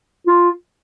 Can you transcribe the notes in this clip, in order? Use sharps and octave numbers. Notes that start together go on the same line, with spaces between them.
F4